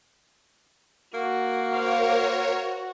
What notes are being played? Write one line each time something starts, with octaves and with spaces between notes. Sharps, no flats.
A#3 F#4
A#4 C5 C#5 F5